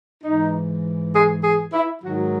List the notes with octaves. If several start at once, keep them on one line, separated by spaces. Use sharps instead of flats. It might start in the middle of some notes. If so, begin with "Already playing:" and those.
G#2 E3 D#4
G#4
G#4
E4
G#2 D#3 F#3 F#4